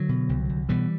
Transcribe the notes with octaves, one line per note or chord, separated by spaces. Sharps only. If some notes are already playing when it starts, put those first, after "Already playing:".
Already playing: D3 F#3
B2
C2
C2
B2 E3 G3